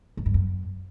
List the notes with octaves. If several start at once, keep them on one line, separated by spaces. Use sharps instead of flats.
G#2
G2
F#2